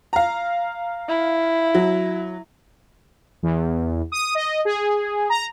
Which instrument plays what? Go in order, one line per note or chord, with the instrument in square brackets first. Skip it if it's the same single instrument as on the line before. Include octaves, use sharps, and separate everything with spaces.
[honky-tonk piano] F5 A#5
[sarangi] E4
[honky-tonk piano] F#3
[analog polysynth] E2
D#6
D#5
G#4
A#5